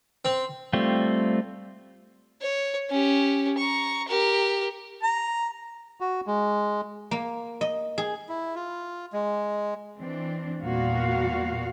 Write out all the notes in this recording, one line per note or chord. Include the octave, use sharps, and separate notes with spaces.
C4
G3 A3 C4 F4
C#5
C#4 G4
A#5 C#6
G4 A#4
A#5
F#4
G#3
A#3
D#5
G#4
E4
F4
G#3
E3 C4 D4
E2 A#2 G3 F#4 F5